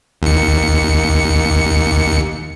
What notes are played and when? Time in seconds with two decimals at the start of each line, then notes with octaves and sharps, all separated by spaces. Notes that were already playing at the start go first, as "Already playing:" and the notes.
0.22 D#2 C#7